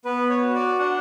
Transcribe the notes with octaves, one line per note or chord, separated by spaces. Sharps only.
B3 B4
C#5
F#4
D5
D4 F#5